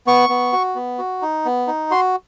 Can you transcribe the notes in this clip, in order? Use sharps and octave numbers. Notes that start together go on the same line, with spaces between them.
B3 C#6
B3
F#4
B3
F#4
D#4
B3
D#4
F#4 C6